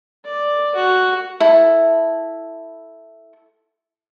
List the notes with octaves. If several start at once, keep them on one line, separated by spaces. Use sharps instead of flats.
D5
F#4
E4 A4